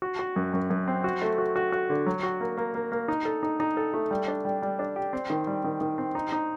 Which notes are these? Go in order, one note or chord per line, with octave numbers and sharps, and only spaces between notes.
F#4
F#4
F#2
F#2
F#2
C4
F#4
A3
F#4
F#4
F#4
D3
F#3
F#4
A#3
A#3
A#3
A#3
D#4
A4
D#4
D#4
A4
A3
G3
D4
G3
G3
D4
G4
C4
D#3
G3
D#3
D#3
C4
D#4
D#4